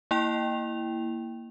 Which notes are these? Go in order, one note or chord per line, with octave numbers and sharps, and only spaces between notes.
A#3 E4 G5 F7